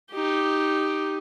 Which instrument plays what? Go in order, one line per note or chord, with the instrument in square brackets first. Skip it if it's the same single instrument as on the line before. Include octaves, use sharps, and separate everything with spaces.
[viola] D#4 G4